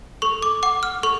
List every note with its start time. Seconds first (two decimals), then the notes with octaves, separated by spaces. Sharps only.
0.22 A4 C#6
0.42 D6
0.63 F#5 D6
0.83 F6
1.03 A4 C#6